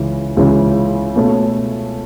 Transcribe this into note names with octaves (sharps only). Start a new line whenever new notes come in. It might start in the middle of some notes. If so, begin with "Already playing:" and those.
Already playing: C#2 C#3 E3
C#2 C#3 E3
B2 A3 C#4